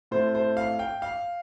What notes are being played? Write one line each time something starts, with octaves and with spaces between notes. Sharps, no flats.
A2 A3 C4 C5
C5
F5
G5
F5